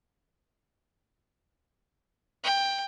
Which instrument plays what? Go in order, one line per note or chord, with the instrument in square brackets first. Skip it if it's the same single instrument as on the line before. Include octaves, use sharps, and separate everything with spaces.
[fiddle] G5